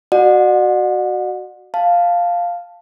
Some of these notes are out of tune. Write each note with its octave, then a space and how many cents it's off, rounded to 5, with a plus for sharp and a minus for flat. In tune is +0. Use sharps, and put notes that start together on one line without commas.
F#4 +0 D5 +40 F#5 -30
F5 +0 A5 +0